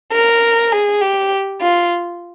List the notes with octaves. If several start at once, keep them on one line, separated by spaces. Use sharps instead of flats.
A#4
G#4
G4
F4